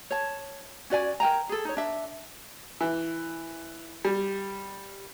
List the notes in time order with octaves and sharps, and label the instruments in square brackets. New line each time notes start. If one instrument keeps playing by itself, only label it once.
[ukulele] C#5 A5
C#4 F#4 D5 G#5
A#4 G5 G#5 A#5
G#4 A4
D#4 C#5
D4 E5
[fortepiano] E3
G3